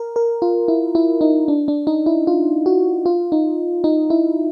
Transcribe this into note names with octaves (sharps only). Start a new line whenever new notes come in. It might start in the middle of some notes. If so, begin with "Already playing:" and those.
Already playing: A#4
A#4
F4
E4
E4
D#4
D4
D4
D#4
E4
F4
F#4
F4
D#4
D#4
E4